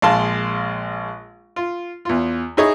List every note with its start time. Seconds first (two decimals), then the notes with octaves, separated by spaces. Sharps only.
0.02 A#1 G#3 F5 A5 C6
1.56 F4
2.05 E2 F4
2.57 D#4 E4 G#4 C#5 D#5